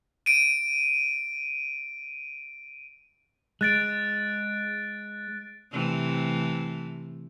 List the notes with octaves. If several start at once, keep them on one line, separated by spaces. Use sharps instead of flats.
D7 D#7
G#3 F#6 A6 D7
C3 E3 A3